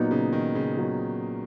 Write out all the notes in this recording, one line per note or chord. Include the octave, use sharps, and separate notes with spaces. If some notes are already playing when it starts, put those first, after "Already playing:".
Already playing: A#2 F#3 B3 D#4
C#3
D#3
C#3
A#2 F#3 B3 D#4